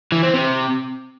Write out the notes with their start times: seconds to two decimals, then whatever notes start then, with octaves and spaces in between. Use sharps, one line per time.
0.12 E3
0.23 C4
0.34 C3